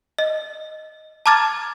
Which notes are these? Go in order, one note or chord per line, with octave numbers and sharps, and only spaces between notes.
D#5
A5 A#5 D6 F6 G#6 A6